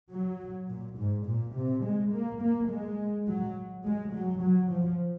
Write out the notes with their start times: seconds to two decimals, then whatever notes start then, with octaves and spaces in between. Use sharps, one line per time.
0.11 F#3
0.68 A#2
0.96 G#2
1.26 A#2
1.55 C3
1.83 G#3
2.12 A#3
2.41 A#3
2.69 G#3
3.28 F#3
3.85 G#3
4.14 F#3
4.42 F#3
4.71 F3